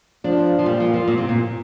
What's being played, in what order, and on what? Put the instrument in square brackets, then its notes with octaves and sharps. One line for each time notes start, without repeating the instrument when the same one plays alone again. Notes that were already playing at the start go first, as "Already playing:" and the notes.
[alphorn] F3 [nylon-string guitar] D4
[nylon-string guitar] F3
[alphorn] A#2 [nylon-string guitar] G3
[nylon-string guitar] F3
F3
A#2
C3
A#2